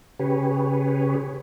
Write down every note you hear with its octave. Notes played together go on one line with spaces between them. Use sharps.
C#3 G4 G#4 B4 C#5